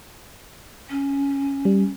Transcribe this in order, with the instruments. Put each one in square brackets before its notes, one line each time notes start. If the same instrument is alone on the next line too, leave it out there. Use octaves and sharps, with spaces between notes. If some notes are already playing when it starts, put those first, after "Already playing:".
[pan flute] C#4
[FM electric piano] G3